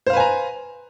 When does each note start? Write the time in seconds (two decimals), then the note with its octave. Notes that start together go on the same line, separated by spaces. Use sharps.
0.07 C5
0.10 F5
0.13 B4
0.17 G#5
0.20 A#5